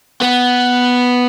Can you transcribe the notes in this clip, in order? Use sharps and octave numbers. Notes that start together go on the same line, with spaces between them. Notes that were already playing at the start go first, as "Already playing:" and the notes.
B3